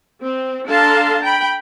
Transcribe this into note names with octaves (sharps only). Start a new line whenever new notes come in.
C4
D4 A4 F5 A5 A#5 C6
G5 B5